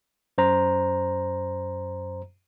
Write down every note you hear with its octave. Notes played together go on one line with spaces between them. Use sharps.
F#2 C5 A#5